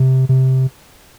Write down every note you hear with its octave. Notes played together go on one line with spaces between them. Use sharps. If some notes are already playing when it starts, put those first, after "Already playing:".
Already playing: C3
C3